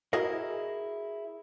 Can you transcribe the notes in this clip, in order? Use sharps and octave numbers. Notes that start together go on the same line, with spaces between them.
E4 F#4 G#4 A#4 D#5